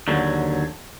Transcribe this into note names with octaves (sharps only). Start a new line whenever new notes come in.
D#2 D3 F#3